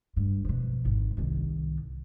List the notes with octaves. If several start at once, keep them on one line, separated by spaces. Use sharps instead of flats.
G2
F2 B2
G#1
C2 D#3